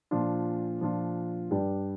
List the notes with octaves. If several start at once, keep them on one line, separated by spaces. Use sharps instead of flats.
A#2 F3 D4 F4
A#2 F3 D4 F4
G2 G3 D4 G4